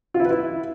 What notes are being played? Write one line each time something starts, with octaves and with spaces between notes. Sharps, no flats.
F4
E4
B4
E4